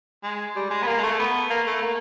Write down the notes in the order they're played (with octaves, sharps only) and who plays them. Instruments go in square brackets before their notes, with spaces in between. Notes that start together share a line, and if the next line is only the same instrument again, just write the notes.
[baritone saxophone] G#3
G3
G#3
B3
A#3
G#3
A3
B3
A#3
A3
A#3